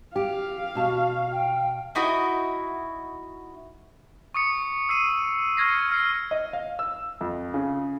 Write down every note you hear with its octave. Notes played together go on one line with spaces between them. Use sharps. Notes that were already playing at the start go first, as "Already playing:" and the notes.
G4 F5
B2 F#4 A5
G5
D#4 E4 F#4 D#5
C#6 D#6 C#7
E6 C7 D#7
C#6 F6 G#6 A#6 C7
F6 C7
D#5
F5
E6
F2
C#3